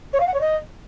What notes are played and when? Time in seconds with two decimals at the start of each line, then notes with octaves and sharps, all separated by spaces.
0.13 C#5
0.20 F5
0.27 F#5
0.34 C#5
0.41 D#5